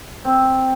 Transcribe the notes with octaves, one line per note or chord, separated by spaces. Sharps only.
C4